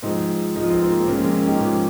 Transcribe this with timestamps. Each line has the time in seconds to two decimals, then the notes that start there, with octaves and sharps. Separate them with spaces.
0.03 G#2 F3 C4 D#4
0.56 G#2 F3 D#4
0.63 F4
0.70 C4 D#4
0.81 C4 D#4
0.92 A#3
1.00 C4
1.08 G#2 F3 A#3 C#4
1.21 G#3 C4
1.34 A#3 C#4
1.48 D#4 G4
1.60 G#2 F3